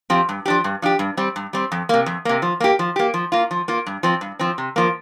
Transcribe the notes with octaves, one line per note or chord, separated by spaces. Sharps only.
F3 C4 G4
G2
F3 D4 G4
G2
F3 D4 G4
G2
G3 C4
G2
G3 C4
F2
C3 A#3
F2
C3 A#3
F3
A#3 G4
F3
A#3 G4
F3
A#3 F4
F3
A#3 F4
G2
F3 C4
G2
F3 C4
C3
F3 A#3